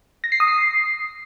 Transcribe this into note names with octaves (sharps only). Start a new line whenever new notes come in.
A#6
C7
D#6
C7